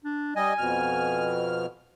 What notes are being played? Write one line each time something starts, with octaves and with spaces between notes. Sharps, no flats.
D4
G3 D#5 G#5
F2 B2 F6